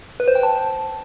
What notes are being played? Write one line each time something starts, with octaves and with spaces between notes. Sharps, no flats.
B4
C5
G5
A5